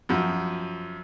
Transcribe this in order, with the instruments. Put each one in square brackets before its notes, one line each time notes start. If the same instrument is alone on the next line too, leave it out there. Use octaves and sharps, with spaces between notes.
[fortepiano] F#2 F3